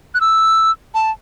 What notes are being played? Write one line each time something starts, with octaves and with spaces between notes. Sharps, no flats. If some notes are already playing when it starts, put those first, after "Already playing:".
F#6
E6
A5